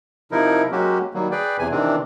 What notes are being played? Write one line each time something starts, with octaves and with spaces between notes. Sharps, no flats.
C3 F3 D#4 E4 A#4
F#3 G#3 A#3 C#4 F#4 G4
D#3 F#3 G3 A#3
G#4 B4 D5 G5
E2 C3 G#5
C3 D#3 E3 C4 D4